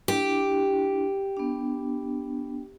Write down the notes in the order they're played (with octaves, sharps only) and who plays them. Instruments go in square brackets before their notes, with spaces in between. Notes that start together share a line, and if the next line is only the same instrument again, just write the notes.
[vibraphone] D4 E4 [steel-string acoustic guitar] G4
[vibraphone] B3 D4